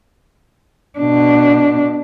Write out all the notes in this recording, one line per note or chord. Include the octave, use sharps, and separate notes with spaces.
B2 D4